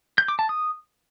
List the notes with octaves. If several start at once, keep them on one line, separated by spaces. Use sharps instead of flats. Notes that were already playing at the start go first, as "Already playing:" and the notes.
G6
D6
A5
D#6